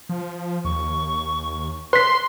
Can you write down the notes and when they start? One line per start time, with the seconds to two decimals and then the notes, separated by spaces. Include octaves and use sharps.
0.09 F3
0.65 D#2 C#6
1.93 B4 C6 B6